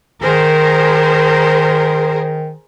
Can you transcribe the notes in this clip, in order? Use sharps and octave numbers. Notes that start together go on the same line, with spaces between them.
D#3 G#4 A#4 C5